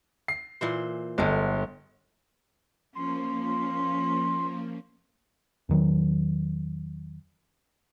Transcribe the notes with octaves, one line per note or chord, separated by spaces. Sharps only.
C7
A#2 E3 C5
G1 D3 G#3
F3 A#3 C#4 C6
E2 D#3 F#3